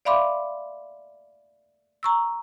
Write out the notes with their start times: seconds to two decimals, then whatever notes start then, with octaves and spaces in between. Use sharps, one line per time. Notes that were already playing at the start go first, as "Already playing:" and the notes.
0.05 D5 E5 F5 B5 C6 D6
2.03 A#5 C#6 E6